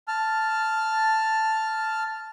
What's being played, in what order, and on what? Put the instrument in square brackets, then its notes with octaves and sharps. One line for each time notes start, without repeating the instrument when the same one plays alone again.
[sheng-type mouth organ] A5 F6